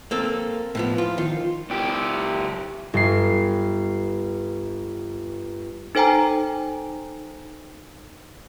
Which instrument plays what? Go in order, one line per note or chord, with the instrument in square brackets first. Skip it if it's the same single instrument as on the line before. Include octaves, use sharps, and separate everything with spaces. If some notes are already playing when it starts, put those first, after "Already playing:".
[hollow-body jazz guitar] A#3 C4 A4
[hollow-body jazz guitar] A2 B3 [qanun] E3 F3
[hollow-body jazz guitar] F4
[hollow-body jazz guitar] D#3 [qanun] F4
[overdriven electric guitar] C#2 G4
[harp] G1 C7
[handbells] D#4 A4 C5 G5 G#5 A#5